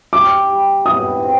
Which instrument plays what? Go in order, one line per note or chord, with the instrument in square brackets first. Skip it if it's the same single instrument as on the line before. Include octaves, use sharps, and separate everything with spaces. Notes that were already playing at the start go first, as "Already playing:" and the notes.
[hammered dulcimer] G3 [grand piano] D6
[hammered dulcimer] G3
[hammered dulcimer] B2 [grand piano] D#6
[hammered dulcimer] C4